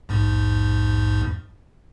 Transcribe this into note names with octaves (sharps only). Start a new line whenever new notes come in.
A#1 E2 G#2